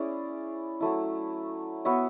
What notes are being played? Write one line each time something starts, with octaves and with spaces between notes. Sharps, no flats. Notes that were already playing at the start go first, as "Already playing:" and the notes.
Already playing: C#4 E4 G#4 D5
F#3 A3 E4
B3 F#4 C#5 E5